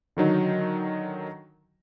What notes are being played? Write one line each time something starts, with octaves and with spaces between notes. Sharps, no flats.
D3 D#3 F#3 D#4